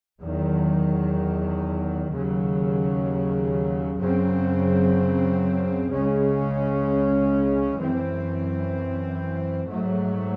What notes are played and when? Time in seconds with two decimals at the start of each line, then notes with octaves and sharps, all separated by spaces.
0.22 E2 D#3 F#3
2.11 D#2 C#3 F#3
4.00 F#2 C#3 F#3 C4
5.89 C#2 C#3 G#3 C#4
7.77 F#2 E3 C4
9.66 G#2 F#3 A3